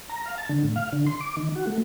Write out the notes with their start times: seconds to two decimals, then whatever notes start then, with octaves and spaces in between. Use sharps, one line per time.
0.09 A#5
0.26 F5
0.38 A5
0.49 D3
0.64 A2
0.76 F5
0.92 D3
1.06 C6
1.21 D6
1.37 D#3
1.56 F#4
1.67 A3